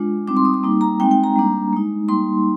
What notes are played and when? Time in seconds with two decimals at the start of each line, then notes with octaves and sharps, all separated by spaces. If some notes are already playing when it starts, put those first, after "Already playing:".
Already playing: G#3 D4 F4
0.27 G3 C4 D#4 D6
0.37 C6
0.45 D#6
0.54 D6
0.63 G3 A#3 D#4
0.81 A#5
1.00 G#3 C4 D#4 G5
1.11 G5
1.24 A#5
1.36 G3 A#3 D4
1.73 G#3 D#4
2.08 G3 A#3 D#4 C6